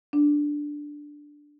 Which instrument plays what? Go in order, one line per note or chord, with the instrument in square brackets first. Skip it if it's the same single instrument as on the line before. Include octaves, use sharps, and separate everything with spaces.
[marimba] D4